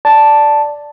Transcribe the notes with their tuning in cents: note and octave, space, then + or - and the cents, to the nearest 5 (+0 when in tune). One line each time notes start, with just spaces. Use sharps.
D5 +0 A5 +0